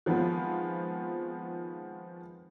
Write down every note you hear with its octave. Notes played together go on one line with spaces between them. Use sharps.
D#3 F3 G#3 B3 C4 F4